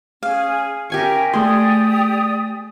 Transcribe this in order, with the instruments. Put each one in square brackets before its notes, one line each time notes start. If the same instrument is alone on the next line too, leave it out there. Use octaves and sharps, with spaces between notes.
[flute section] C#4 G#4 [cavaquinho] F5
[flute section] C#4 A#4 E5 [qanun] G4 G#5 C#6
[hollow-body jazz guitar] A3 C6 [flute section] G4 D5 D#6 [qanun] G#4